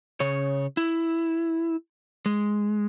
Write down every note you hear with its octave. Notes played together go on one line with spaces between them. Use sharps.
C#3 C#5
E4
G#3